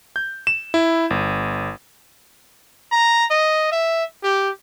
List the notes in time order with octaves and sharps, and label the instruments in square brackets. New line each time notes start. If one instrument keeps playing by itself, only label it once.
[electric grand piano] G6
E7
E4
G1
[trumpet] A#5
D#5
E5
G4